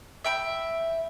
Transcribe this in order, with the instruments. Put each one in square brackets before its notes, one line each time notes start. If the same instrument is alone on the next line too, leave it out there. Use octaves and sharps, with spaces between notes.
[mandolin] E5 G5 B5